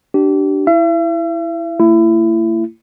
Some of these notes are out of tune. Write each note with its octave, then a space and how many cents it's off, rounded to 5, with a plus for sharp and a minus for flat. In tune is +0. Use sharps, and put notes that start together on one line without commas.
D4 +0 G4 -30
E4 +0 E5 +45
A3 +45 E4 +25